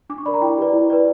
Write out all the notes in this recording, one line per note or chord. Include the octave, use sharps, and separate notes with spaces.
D4 D6
C#6
A#4 D5 B5
A#5
E4 G5
G4 B4 D5
E4
B4 D5